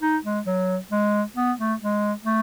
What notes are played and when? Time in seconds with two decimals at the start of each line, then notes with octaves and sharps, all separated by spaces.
0.02 D#4
0.25 G#3
0.46 F#3
0.91 G#3
1.37 B3
1.59 A3
1.81 G#3
2.25 A3